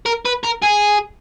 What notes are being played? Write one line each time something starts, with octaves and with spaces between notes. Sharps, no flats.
A#4
B4
A#4
G#4